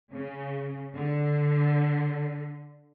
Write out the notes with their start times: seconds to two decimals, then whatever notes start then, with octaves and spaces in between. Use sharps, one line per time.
0.13 C#3
0.94 D3